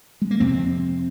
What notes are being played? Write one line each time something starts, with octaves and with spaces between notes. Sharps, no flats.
G#3
A#3
F2 C3 C4